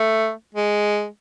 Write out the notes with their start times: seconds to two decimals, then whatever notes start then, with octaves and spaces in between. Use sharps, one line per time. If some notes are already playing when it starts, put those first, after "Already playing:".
Already playing: A3
0.54 G#3